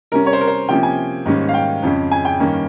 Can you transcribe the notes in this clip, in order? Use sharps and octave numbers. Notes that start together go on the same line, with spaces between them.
C3 G3 C#4 A#4
C#5
C5
A#4
C5
C3 F3 A#3 C#4 G5
G#5
G#2 D#3 G3 A#3 C#4
F5
G5
F2 C#3 G#3 C#4
G#5
G5
G2 D#3 A#3 C#4